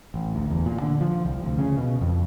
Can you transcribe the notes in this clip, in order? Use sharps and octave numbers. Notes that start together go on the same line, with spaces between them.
A1
D2
E2
A#2
D3
F3
C2
D2
C#3
B2
F2